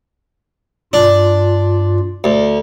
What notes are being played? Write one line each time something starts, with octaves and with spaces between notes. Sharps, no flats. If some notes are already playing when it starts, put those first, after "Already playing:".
G2 D4 F4
D2